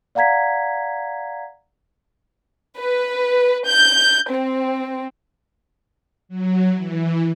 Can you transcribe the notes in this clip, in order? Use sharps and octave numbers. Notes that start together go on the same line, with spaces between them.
D5 F5 F#5 A#5 G#6 B6
B4
G6
C4
F#3
E3